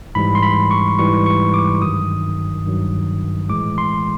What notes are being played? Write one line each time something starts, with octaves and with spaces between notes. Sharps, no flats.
G#2 E3 G3 B5
C6
B5
C#6
G#2 E3 G3 C#6
C#6
D6
G2 D#3 F#3 D#6
G2 D#3 F#3
A2 E3 G#3 D6
C6